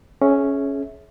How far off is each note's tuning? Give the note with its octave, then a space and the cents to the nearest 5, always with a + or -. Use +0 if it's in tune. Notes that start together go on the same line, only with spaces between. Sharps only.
C#4 +0 G#4 +30 E5 -15